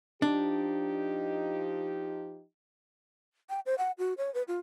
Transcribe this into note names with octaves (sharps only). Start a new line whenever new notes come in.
F3 D4 D#4 G4
G5
C5
F#5
F#4
C#5
B4
F4